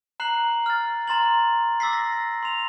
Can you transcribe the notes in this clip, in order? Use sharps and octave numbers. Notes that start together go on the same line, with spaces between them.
A#5 F#6 C7 F#7
F6 A6
A#5 C6 A6 F#7
D6 E6 A6 B6 C7
A#6
C6 F7